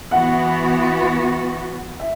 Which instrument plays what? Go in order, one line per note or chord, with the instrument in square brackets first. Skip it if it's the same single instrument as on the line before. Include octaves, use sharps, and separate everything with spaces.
[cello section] E3 B3 F#4 [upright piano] F#5
[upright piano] E5